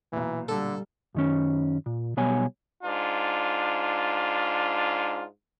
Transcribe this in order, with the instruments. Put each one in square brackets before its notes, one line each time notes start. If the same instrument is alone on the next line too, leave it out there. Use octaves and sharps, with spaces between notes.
[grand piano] B1 A#2 [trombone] E3
[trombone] D3 [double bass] G3 [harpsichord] A4
[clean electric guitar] F#2 D#3 C#4
A#2
B1 G3 B3 C#5 G#5
[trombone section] G#2 D4 F4